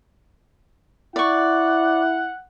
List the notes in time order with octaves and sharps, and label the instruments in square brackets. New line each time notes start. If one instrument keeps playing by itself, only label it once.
[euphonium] E4 [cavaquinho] D5 C#6 [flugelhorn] F#5